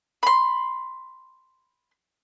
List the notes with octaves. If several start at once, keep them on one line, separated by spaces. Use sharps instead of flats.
B5 C6